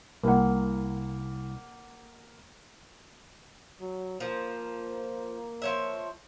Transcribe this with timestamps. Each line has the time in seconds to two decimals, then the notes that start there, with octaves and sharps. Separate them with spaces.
0.24 C2 A#3 F#5
3.80 F#3
4.20 F3 A#3
5.62 F3 C#5 E5